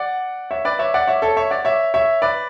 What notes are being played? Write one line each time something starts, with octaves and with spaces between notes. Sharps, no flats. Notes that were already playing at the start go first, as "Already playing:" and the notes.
Already playing: D5 F#5
C#5 E5
B4 D5
C#5 E5
D5 F#5
C#5 E5
A4 C#5
C#5 E5
D5 F#5
C#5 E5
C#5 E5
B4 D5